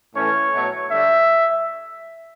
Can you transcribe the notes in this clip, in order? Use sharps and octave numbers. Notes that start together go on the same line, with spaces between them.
A2 E3 A3 C#4 C#5
B2 F#3 A3
D3 G3 D4 E5